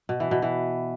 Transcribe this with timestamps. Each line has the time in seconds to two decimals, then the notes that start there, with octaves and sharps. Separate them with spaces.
0.09 B2
0.20 E3
0.31 B2
0.42 E3